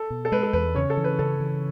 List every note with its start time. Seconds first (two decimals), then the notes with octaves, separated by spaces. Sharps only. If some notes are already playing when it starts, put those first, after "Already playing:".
Already playing: A4
0.10 B2
0.25 A4
0.32 G#3 B4
0.43 A4
0.53 E2 B4
0.75 C#3 C#4 C#5
0.90 A4
0.97 E3
1.04 B4
1.19 C#3 A4
1.40 E3